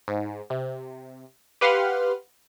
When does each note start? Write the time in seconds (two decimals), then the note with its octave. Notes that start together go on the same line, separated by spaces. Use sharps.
0.08 G#2
0.50 C3
1.61 G4 B4 F5 F#5 C6 F6